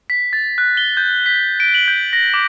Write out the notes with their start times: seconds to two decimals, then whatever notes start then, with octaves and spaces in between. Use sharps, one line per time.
0.10 B6
0.33 A6
0.58 F#6
0.77 G7
0.97 G6
1.26 B6
1.60 D7
1.74 F#7
1.88 G6
2.13 A#6
2.34 D6